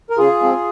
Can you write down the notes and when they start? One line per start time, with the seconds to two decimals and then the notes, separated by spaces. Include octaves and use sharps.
0.10 A#4
0.18 C#3 F4 G#4
0.40 F3 G#3 C4